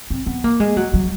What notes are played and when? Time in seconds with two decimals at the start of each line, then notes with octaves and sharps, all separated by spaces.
0.10 C4
0.26 B3
0.44 A#3
0.60 G#3
0.77 F#3
0.94 F#3